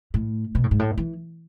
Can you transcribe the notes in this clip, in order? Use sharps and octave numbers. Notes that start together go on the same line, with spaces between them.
A2
B2
A2
G#2
A2
E3